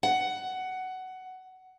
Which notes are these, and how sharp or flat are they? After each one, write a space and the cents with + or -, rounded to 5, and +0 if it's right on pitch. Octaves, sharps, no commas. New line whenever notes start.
F#5 +15